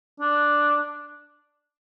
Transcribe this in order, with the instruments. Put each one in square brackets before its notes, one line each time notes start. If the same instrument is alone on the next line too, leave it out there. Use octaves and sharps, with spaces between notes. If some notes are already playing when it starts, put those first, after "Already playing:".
[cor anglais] D4